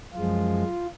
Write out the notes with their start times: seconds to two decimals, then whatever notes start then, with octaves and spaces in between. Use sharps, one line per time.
0.14 F#2 F3 G#3 F4